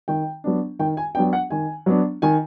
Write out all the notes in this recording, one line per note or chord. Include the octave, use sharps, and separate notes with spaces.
D#3 G5
F#3 B3 D4
D#3 G5
G#5
F#3 B3 D4 G5
F#5
D#3 G#5
F#3 B3 D4
D#3 G#5